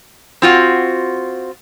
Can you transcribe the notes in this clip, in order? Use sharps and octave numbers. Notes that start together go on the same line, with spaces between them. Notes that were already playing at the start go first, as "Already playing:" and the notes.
C4 F4 F#4